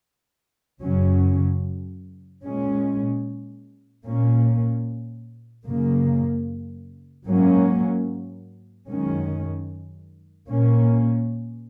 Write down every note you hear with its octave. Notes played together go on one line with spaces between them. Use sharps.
F#2 C#3 F#3 C#4
A#2 G#3 C#4
A#2 A#3 C#4
F#2 C#3 A#3
G#2 F#3 A#3 C#4
F#2 D#3 G#3 C#4
A#2 A#3 C#4